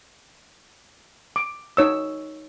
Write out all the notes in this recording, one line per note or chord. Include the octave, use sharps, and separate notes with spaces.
D6
D#4 C#5 E6